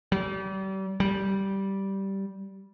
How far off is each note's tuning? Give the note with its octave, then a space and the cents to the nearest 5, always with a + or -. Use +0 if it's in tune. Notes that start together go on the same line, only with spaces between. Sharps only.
G3 -35
G3 -10